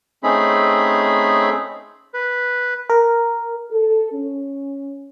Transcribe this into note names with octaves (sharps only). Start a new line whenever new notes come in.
A3 C4 C#4 D#4 G#4 B5
B4
A#4
A4
C#4